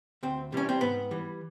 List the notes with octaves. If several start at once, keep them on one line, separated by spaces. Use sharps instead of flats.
D2 C4
C3 E3 G3 C#4
C4
G#2 B3
E3 G3